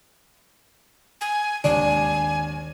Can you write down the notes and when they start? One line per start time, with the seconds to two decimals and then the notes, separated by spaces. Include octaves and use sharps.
1.21 G#5
1.64 G#1 D#2 D4 G#5